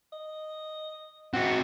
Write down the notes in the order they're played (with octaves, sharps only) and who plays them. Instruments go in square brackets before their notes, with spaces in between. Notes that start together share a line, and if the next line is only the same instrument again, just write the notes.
[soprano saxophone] D#5
[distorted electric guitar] C4 F#4 [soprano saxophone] F#5